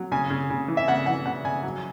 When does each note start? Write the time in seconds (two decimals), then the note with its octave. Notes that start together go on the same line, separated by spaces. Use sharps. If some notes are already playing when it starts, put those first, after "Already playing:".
Already playing: F#3
0.12 C#3 G#5
0.30 C#3
0.50 C#3
0.68 E3
0.77 E5
0.88 C#3 F#5
1.06 E3 F#5
1.26 C#3 F#5
1.45 C#3 G#5
1.63 F#3